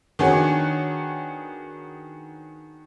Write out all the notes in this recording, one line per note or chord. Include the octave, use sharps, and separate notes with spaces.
D#3 B3 D4 F#4 G#4 C#5